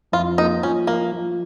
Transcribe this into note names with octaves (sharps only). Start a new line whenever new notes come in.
F2 F4
A#3 D#4
F3 C#4
F3 A#3
F3